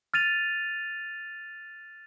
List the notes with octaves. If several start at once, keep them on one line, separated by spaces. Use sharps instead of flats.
F6 A6 D#7 F7